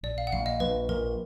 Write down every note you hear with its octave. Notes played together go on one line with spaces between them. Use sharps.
A#1 D5
F5
F#5
A#1 F5
D#5
A#1 B4
A#1 A#4